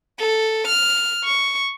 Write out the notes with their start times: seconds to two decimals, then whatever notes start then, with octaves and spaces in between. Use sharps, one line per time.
0.19 A4
0.67 F6
1.24 C#6